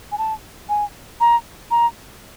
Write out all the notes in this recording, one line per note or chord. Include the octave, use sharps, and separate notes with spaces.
G#5
A5
G#5
A#5
A#5